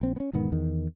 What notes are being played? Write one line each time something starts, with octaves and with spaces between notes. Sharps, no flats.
A#1 C4
B3 C#4
E1 G#2 D#3 B3
E2 D#3